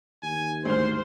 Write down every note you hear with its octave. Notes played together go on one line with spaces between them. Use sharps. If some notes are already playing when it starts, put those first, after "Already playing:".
D#2 G#5
D2 G#2 C5 C6 F6